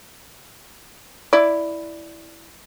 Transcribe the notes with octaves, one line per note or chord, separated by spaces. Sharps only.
E4 D5